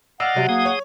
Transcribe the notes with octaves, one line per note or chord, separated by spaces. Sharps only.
D5 D#5 F5 F#5 E6 F6
C3 F#3
A#3 G#4 D#6
C#5